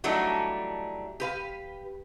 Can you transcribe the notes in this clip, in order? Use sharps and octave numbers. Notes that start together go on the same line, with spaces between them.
E3 F#3 G3 A3 D4 D#4
G4 B4 F5